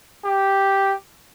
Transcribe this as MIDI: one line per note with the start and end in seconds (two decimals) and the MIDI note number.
0.25 0.94 67